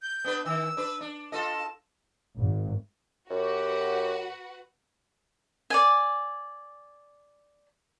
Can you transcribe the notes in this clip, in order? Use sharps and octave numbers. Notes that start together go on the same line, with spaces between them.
G6
B3 D4 B4
D#3 E6
D4 B4
D4
F4 A4 D#5 A5
G#1
F#2 F#4 G4 B4 F#5
D5 G#5